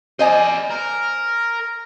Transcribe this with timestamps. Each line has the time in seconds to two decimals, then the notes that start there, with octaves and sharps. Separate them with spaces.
0.19 G#4 C5 D5 D#5 G#5
0.70 A#4